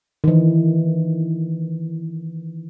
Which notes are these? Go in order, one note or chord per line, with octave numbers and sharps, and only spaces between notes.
D#3 E3